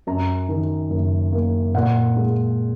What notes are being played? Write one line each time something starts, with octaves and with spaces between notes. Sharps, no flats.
F#2 A#5
D#3
F#1
A#3
A#2 F#5
G#3